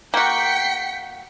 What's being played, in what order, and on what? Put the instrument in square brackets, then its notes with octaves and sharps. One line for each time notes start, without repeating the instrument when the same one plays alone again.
[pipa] A#3 F#4 [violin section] G5 B6 C#7